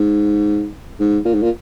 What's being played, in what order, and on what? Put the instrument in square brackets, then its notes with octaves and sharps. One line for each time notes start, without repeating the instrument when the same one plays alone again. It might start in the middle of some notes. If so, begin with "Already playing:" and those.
Already playing: [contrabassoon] G#2
G#2
A#2
G#2
A#2